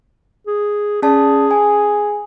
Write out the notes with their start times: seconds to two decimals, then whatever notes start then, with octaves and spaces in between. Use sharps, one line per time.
0.47 G#4
1.02 C#4 G#4 D5 A5
1.51 G#5